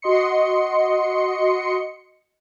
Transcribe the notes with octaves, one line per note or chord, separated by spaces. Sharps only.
F#4 D#5 C6 C#7